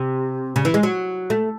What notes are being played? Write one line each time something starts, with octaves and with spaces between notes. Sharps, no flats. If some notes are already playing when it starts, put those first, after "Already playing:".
Already playing: C3
C#3
E3
G#3
F#3
A3